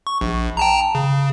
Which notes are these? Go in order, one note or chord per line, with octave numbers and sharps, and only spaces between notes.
C#6
A#1
G5 A5 A#5
C#3